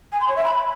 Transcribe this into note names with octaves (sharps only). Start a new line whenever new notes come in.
G#5
C6
C#5
E5
B5